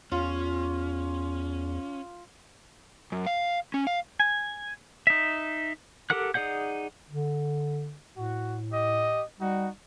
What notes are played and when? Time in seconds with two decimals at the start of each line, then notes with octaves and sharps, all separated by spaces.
0.12 E2 C#4 F4
3.12 F#2
3.26 F5
3.74 C#4
3.87 F5
4.20 G#5
5.07 D#4 E5
6.10 G4 A4 A#4 F#5 F#6
6.34 D#4 G#4 D5 F#5 G6
7.10 D3
8.16 A2 F#4
8.71 G4 D#5
9.39 G3 D#4 F#4